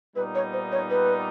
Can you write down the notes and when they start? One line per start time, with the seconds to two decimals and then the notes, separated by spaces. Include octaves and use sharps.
0.16 A#2 G3 B3 D#4 B4
0.35 C#5
0.53 C5
0.72 C#5
0.90 B4